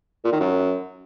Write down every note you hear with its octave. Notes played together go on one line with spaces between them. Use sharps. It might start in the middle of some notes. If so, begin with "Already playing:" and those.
A#2
D#3
F#2